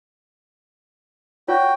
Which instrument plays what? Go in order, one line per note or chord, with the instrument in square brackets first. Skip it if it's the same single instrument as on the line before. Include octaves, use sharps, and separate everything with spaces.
[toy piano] F4 C#5 [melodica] F#4 G5